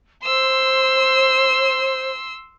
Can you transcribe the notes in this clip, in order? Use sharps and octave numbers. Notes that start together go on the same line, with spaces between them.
C5 C6 E6